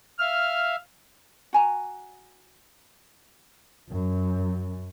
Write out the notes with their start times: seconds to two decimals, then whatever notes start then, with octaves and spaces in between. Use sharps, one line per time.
0.19 E5 F5 F6
1.53 F#4 G#5 A#5
3.92 F#2